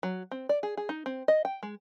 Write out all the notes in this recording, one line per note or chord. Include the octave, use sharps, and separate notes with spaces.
F#3
C4
D5
G#4
G#4
D#4
C4
D#5
G5
G#3